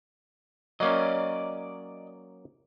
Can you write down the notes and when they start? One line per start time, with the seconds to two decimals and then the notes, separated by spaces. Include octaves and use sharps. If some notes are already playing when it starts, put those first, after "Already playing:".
0.80 F#3 A#3 C#4 D5 D#5